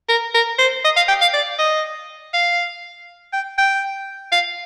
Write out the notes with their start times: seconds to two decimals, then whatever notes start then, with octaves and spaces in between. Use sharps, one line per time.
0.09 A#4
0.34 A#4
0.59 C5
0.84 D#5
0.96 F5
1.08 G5
1.21 F5
1.33 D5
1.59 D#5
2.34 F5
3.33 G5
3.58 G5
4.32 F5